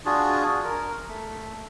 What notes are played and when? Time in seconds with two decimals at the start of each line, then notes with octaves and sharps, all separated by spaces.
0.06 D4 F4 F#4 G#4
0.64 A#4
1.08 A3